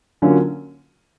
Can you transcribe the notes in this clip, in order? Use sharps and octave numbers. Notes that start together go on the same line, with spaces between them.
D3 F#3 A#3 C#4 F4